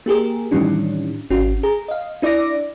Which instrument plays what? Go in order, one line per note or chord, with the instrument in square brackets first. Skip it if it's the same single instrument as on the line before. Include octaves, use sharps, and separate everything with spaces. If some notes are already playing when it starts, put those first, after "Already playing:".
[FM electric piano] A#3 G4 G#4 A#4
A2 D#3 E3 G3 C#4 D4
G#1 C#4 F#4
G#4 A#5
D#5 F5
D4 E4 D5 E5 D6 A#6